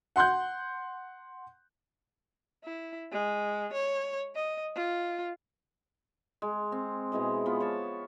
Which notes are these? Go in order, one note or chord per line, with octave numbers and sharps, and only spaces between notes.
F#5 C6 F#6 G6
E4
G#3
C#5
D#5
F4
G#3
C4
B2 E3 G#3 G#4
F3 B3
C#5 A5